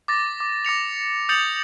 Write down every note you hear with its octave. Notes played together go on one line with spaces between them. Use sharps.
D6 A6 A#6
D6
D6 A#6 C#7 F7
D#6 G6 A6 C#7 F7 F#7